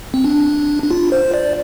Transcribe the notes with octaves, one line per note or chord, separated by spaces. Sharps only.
C4
D4
D4
F4
C5
D5